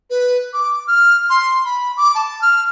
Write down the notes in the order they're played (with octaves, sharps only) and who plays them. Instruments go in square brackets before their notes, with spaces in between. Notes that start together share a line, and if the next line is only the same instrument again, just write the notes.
[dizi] B4
D6
F6
C6
B5
D6
A5
F6